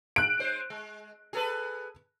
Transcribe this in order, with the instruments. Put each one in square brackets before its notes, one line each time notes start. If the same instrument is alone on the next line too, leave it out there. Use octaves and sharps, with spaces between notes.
[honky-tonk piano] F#6 D7
[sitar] G#3 C5
G#3
G#4 A4 B4